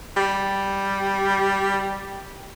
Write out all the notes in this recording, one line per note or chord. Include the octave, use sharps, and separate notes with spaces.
G3